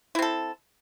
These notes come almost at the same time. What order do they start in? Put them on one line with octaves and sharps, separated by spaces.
E4 C4 A4